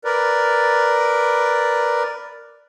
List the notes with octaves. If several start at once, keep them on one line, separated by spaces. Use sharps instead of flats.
A#4 B4 D5